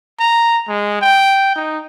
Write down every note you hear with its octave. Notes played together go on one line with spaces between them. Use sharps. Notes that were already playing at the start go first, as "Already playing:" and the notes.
A#5
G#3
G5
D#4